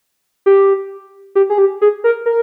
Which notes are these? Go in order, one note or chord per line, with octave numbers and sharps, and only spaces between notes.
G4
G4
G#4
G4
G#4
A#4
A#4